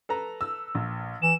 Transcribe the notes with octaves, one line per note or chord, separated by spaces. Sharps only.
A4 B4 A#5
E6
A#1
E3 E7